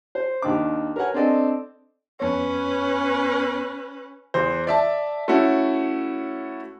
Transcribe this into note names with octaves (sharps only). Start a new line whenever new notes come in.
C5
D#2 D#3 D4 D6
A#4 B4 C#5 F#5 G#5
C4 D4 A4 D5 D#5
F2 B3 C#4 B4 C#5
E2 C5
D5 E5 A5
A3 C#4 E4 F#4